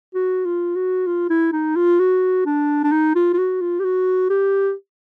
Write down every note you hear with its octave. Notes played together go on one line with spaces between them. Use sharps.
F#4
F4
F#4
F4
E4
D#4
F4
F#4
D4
D4
D#4
F4
F4
F#4
F4
G4
F#4
G4